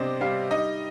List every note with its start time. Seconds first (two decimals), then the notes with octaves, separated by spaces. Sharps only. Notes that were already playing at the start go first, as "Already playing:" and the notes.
Already playing: C3 B3 D4 C5 D5 D#5
0.21 G3 F5
0.51 D#4 D#5